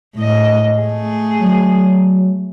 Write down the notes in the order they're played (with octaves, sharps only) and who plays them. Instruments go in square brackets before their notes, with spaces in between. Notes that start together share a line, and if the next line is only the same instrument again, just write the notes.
[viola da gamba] A2 D#5
A3 G#4
[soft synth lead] F#3